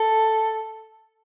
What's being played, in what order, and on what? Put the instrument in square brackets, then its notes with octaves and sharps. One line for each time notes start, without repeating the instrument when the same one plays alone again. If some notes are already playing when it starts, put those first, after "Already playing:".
Already playing: [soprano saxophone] A4